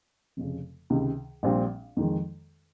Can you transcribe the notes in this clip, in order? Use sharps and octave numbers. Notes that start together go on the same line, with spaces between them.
F1 F2 C#3
C#2 C3 D#3
A#1 A#2 G3 C4
F2 D#3 G#3